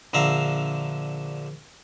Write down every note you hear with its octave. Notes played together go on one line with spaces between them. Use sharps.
A#1 D3 E5 F5 A#5